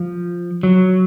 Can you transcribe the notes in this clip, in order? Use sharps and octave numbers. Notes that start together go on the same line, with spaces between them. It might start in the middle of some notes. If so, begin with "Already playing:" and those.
Already playing: F3
F#3